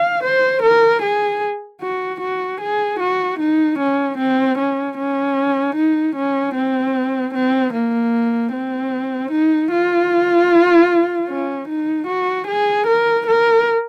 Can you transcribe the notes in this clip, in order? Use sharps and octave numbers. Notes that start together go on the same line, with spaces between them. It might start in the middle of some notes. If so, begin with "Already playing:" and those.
Already playing: F5
C5
A#4
G#4
F#4
F#4
G#4
F#4
D#4
C#4
C4
C#4
C#4
D#4
C#4
C4
C4
A#3
C4
D#4
F4
C#4
D#4
F#4
G#4
A#4
A#4